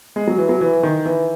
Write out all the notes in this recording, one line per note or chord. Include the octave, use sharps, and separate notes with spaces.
G#3
F#3
E3
F#3
E3
D#3
E3